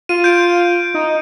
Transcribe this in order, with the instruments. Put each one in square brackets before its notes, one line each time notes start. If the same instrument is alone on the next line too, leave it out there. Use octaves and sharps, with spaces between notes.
[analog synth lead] F4 [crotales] D#7
[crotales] G6 D7
[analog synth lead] D#4